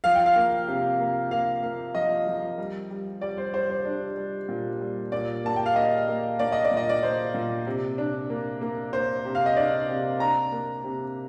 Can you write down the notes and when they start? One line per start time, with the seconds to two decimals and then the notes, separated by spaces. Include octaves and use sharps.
0.04 F3 F5
0.15 G5
0.26 F5
0.36 A#3
0.68 C3
0.99 A#3
1.31 A#3 F5
1.63 A#3
1.95 F3 D#5
2.27 F3
2.58 G3
2.90 G3
3.21 G3 D5
3.38 C5
3.54 G3 C5
3.70 C5
3.85 D4
4.17 G3
4.49 A#2
4.80 G3
5.12 A#2 D5
5.45 A#3 A5
5.56 G5
5.66 F5
5.76 A#3 D#5
6.08 A#3
6.39 A#3 D5
6.52 D#5
6.64 D5
6.71 A#2
6.77 D#5
6.89 D5
7.03 A#3 C5
7.34 A#2
7.66 C3
7.98 D4
8.30 A#3
8.61 A#3
8.93 A#3 C5
9.25 C3
9.35 F5
9.46 D#5
9.56 D4 D5
9.89 C3
10.20 D4 A#5
10.52 A#3
10.84 C3